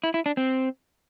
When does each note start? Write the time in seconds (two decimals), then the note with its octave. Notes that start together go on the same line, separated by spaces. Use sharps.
0.04 E4
0.14 E4
0.26 D4
0.37 C4